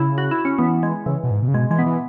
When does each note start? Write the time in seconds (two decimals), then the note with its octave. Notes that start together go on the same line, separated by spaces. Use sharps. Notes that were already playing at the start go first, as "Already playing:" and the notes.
Already playing: C#3 E4
0.18 F#4
0.31 E4
0.45 C#4
0.59 E3 B3
0.83 G#3
1.06 C#3 E3
1.24 B2
1.31 G#2
1.43 B2
1.48 C#3
1.54 B2 G#3
1.70 E3 G#3
1.79 B3
1.86 E3